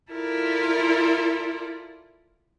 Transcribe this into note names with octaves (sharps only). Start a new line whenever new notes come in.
E4 F4 A4 A#4 D5